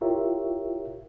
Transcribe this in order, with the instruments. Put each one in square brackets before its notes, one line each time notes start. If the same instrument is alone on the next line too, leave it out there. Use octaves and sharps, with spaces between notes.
[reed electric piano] E4 F4 G4 A#4 C#5 E5